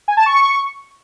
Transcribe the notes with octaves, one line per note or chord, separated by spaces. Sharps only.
G#5
A5
C#6